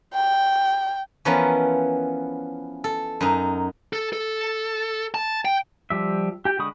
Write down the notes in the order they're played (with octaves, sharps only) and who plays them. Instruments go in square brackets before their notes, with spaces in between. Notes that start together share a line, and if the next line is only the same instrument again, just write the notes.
[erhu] G5
[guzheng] E3 F3 B3 C#4 A#4
A4
F#2 D#4
[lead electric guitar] A4
A4
A5
G5
[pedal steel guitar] F3 G3 E5
G4 G5
D3 G#3 B5 C#6 D#6